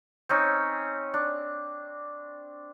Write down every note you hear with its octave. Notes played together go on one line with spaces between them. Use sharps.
C4 C#4 D#4
D4